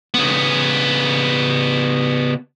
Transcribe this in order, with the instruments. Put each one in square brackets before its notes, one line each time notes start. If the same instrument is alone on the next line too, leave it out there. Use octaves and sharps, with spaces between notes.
[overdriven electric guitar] C#3 B3